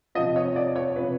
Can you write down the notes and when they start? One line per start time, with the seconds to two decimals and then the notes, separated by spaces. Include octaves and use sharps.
0.15 F3 D#5
0.19 C3
0.36 C#5
0.56 D5
0.76 C#5
0.96 C3 F3 B4